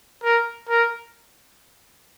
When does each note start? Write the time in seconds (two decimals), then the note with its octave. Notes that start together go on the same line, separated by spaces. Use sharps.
0.23 A#4
0.69 A#4